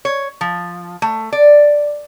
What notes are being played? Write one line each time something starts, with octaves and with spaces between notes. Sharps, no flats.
C#5
F3
A3
D5